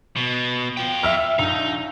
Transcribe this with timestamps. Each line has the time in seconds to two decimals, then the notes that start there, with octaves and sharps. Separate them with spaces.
0.16 B2
0.77 F4 G5
1.03 E5 E6 F6
1.39 A#1 D#4